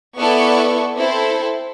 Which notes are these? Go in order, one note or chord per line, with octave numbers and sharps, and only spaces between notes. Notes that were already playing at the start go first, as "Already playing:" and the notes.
B3 E4 A4 B4 D5 C#6
C4 E4 A4 C5